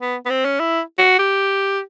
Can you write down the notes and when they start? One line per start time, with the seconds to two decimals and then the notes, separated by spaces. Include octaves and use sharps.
0.01 B3
0.25 B3
0.30 C4
0.45 C#4
0.60 E4
0.99 F#4
1.19 G4